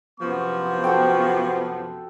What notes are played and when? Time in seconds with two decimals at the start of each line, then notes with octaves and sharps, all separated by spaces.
0.20 F#2 C3 F3 B3 C6 C#6
0.84 F#4 A4 G5